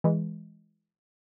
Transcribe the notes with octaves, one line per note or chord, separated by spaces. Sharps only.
E3 G#3